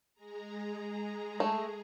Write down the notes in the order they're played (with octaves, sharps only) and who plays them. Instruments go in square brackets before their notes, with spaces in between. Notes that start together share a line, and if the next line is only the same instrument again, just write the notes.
[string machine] G#3 G#4 A#5
[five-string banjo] A3